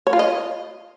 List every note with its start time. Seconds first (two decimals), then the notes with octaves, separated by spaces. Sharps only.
0.07 C#5
0.13 F4
0.19 D#5